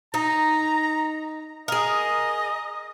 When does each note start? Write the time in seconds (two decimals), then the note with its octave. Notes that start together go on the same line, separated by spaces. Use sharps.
0.14 D#4 A#5
1.68 G#4 A#4 D#5